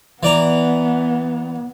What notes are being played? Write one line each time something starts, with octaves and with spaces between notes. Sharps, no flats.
E3 B3 D5 A#5